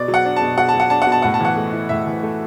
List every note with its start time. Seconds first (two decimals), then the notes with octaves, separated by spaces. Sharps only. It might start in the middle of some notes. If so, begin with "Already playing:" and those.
Already playing: B2 D5
0.08 F#3
0.14 F#5
0.25 D4
0.36 A5
0.42 B2
0.58 B2 F#5
0.68 A5
0.74 F#3
0.80 F#5
0.90 D4 A5
1.02 F#5
1.07 B2
1.12 A5
1.22 A2 F#5
1.34 A5
1.40 E3 F#5
1.56 A3
1.73 E4
1.89 A2 E5
2.07 E3
2.23 A3